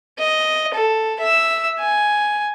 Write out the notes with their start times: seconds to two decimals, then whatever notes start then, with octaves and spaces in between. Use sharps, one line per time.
0.19 D#5
0.74 A4
1.19 E5 E6
1.79 G#5